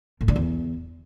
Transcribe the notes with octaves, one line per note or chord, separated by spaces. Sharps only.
A2
D3
E2